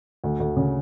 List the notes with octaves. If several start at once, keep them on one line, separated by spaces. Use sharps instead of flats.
D2
D2
C#3